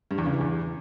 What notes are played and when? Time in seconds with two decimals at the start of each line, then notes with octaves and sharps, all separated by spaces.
0.11 G2
0.18 E2
0.26 C#3
0.33 E3
0.41 E2